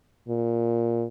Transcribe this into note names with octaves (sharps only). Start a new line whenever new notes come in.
A#2